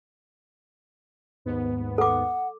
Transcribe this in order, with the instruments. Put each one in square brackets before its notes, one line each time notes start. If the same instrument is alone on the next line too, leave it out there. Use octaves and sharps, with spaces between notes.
[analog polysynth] D#2 G#2 B3
[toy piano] A4 D6 [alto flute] F#5